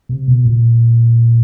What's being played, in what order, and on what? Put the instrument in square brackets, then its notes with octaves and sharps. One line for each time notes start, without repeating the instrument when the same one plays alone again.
[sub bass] C3
B2
A#2